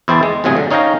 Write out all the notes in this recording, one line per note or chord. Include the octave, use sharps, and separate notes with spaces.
E2 E4 C5 G5 A5
G#3
G1 A2 C3 F#3 G#4
D3
C#4 D#4 C#5 F5 G5 A#5